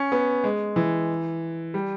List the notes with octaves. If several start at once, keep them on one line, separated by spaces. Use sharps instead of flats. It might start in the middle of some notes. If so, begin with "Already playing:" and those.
Already playing: C#4
B3
G#3
E3
G3